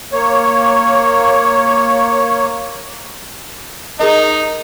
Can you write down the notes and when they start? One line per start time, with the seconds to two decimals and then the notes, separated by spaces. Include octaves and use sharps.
0.13 A#3 C#5
3.99 D#4 G#4 A#4 D#5